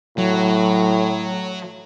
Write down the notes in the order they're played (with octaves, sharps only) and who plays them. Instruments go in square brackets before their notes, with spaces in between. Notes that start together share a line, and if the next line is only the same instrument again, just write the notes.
[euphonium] A2 [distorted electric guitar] F#3